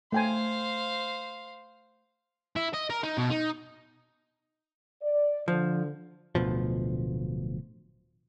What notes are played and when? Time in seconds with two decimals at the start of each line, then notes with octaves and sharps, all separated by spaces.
0.12 A3 C5 F5 G5 G#5
2.56 E4
2.74 D#5
2.90 A#4
3.03 D#4
3.17 B2
3.30 D#4
5.02 D5
5.48 D3 F3
6.35 D1 D2 B2 F3